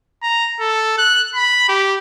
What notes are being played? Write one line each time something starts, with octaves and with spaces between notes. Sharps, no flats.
A#5
A4
F#6
B5
G4